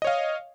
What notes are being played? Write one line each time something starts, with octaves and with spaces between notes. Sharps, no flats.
C#5 D#5 F5